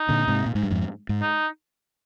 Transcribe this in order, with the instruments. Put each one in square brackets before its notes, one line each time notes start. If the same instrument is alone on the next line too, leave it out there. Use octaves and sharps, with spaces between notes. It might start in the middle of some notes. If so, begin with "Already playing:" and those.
Already playing: [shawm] D#4
[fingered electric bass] A#2 D3
G#2 C3
A#2
G#2
G2
F2 G#2
G#2
[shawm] D#4